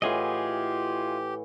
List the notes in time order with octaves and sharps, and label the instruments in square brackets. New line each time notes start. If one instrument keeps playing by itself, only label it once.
[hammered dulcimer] A2 E3 F#5 [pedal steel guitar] F4 G#4 D#5 [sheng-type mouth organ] G4